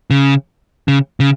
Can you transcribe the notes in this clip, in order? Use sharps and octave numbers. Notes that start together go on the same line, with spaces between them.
C#3
C#3
C#3